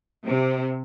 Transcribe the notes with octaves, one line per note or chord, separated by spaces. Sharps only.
C3